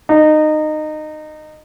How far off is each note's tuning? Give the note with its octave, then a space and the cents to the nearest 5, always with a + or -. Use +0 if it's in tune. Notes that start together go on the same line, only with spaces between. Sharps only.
D#4 -20